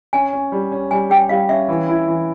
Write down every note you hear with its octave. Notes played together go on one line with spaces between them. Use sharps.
C#4 G#5
C#4
G3
C#4
G3 G#5
G4 G5
G3 F5
C#4 E5
E3
E4
E3